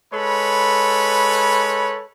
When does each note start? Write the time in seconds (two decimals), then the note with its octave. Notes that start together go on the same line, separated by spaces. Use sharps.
0.13 G#3 A4 B4 C#5 B5